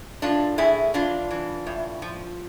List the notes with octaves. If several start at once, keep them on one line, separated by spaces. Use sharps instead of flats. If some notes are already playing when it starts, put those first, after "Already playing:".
A2 D4 F4
A2 E4 G#4
E3 D4 F4
E3
A2
F3